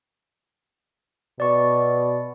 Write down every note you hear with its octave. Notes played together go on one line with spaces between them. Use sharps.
B2 D5 C#6